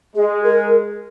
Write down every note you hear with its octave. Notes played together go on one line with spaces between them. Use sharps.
G#3 G#4
A#4